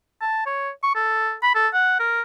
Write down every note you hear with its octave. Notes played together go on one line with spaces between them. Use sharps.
A5
C#5
C#6
A4
B5
A4
F#5
A#4